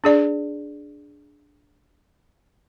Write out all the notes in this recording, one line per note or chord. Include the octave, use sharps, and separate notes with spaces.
D4 G#4 D5